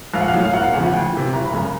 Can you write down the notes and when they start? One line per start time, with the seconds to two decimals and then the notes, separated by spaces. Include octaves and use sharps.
0.14 A#1 F5
0.21 F#5
0.28 F5
0.34 A2 F#3
0.45 F5
0.53 E1 F#5
0.63 F5
0.73 E2 C#3 F3 F#5
0.83 F#5
0.93 D2 G5
1.13 C3 E3
1.33 F#1 A#5
1.45 B5
1.53 F#2 C#3 A#5